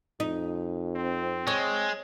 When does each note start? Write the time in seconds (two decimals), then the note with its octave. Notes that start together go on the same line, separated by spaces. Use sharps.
0.20 F2 D#4
0.96 C4
1.47 G#3 C#5